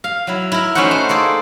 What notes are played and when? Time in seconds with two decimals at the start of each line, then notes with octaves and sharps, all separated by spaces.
0.04 F5
0.27 F#3 E4
0.52 E4 A#4
0.75 A3 C#4 D#4 F#4 C5 F#5
0.91 C5
1.09 A#3 G#4 A4 D5